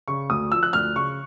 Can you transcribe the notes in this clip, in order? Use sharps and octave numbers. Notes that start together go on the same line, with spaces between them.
C#3 C#6
D2 D#6
F3 E6
F#6
D2 F6
C#3 C#6